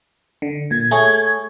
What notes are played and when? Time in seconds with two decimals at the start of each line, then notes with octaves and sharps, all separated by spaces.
0.42 D3
0.71 A#2 G#6
0.91 A3 G#4 C#5